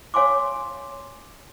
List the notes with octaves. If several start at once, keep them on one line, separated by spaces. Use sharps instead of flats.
C#5 F5 G#5 C6 D6